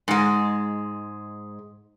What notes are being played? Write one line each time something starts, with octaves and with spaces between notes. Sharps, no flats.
G#2 G#3